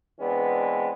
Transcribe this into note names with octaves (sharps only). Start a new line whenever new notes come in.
E3 G#3 B3 C4 D4